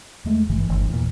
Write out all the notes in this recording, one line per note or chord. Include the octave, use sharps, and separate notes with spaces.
E2 G#3 A3
G#1 G2 D#3 E3
G1 E2
E2 A#2